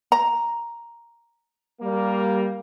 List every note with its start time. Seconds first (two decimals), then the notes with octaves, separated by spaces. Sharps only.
0.12 A#5
1.82 G3 A#3